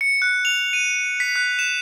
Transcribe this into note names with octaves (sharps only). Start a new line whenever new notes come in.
C#7
F#6
F7
D#7
B6
F#6
E7